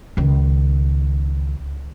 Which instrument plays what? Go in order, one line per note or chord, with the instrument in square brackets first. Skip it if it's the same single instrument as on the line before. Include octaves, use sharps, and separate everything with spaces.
[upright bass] C#2 D#3